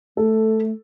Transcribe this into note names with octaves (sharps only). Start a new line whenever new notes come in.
A3 A4